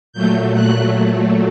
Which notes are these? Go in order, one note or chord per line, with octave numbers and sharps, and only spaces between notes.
A#2 F#3 A3 G6
F#6